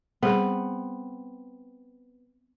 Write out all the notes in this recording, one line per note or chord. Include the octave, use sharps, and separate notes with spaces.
G3 B3 C4 G#4 B4